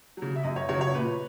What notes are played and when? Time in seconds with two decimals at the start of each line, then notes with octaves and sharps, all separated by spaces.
0.17 C#3 F#3
0.36 E5
0.43 F#2 D#5
0.56 C#5
0.69 C#3 F#3 C#5
0.81 C#5
0.94 A#2 B4